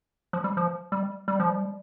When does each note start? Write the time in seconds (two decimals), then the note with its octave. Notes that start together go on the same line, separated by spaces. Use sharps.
0.33 F3
0.44 G3
0.57 F3
0.92 G3
1.28 G3
1.40 F3
1.50 G3